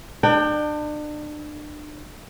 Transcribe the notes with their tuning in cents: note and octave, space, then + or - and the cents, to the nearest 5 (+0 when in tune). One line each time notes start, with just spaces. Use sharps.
D4 +35 G5 +0